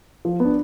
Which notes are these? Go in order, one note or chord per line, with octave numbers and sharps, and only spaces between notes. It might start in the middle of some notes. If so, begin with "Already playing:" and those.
F3
B3
D4